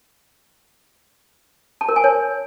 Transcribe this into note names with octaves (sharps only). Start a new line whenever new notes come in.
A5
A#4
G#5
C#5